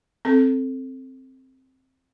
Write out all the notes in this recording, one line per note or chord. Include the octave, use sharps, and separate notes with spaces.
C4 A4